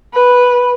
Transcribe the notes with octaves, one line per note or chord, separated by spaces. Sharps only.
B4